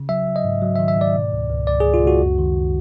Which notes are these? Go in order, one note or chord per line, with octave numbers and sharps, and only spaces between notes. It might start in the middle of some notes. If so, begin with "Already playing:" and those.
Already playing: C#3
F#3 E5
F#3
D#5
G#2
F#3
D#3 E5
E5
G#2 D5
B2
C#2
C#2
C#2 D5
C#2 G#4
F4
C#2 F#4
F#2
D#3